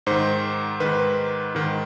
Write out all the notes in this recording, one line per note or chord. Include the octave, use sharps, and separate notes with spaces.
G#2 D#3 C5
G#2 D#3 B4
G#2 D#3